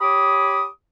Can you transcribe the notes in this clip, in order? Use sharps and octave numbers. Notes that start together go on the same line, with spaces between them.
G4 C#5 B5 D6 D#6